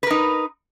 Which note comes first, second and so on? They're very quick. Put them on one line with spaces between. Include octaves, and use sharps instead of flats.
B4 A#4 D#4